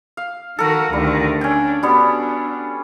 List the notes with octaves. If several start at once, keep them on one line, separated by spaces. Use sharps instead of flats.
F5
D#3 F#4 A4 A#4
D2 D#3 G3
C#4 D4 G5
G3 B3 D4 F#4